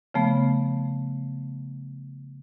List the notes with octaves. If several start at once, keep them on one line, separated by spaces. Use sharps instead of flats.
C#3 F3 A3 B3